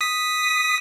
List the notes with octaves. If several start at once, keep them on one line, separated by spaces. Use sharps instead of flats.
D#6 B6